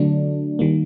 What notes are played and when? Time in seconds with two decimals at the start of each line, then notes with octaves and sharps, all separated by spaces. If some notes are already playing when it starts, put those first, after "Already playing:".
Already playing: D3 F#3 A3 D4
0.59 D#3 G3 A#3